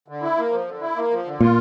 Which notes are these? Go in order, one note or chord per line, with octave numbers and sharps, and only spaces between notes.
D3
E4
A#3
F3
D3
E4
A#3
F3
D3
A#2 F4